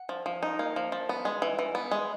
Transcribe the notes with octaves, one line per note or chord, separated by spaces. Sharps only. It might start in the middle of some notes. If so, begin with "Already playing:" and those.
Already playing: F#5
F3
F3
D#4
A#3
F3
F3
B3
G#3
E3
E3
B3
G#3